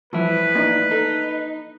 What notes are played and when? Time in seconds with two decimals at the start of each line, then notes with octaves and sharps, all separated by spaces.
0.13 A2 E3 F3 G3 E4 B4
0.55 A#3 D4 D#4
0.91 D#4 A4